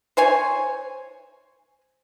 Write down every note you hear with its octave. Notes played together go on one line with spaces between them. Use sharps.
C5 C#5 G#5